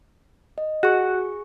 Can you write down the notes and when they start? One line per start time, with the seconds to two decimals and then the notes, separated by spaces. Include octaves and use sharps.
0.58 D#5
0.83 F#4 G#4 C#6